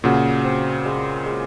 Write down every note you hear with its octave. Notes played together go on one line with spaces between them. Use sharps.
A#2 C#3 F#4
C4
G#3
G#3